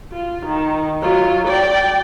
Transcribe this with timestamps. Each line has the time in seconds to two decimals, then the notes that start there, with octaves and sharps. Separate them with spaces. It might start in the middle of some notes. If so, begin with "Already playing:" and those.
0.12 F4
0.46 D#3
1.01 F#3 F4
1.47 D5 G5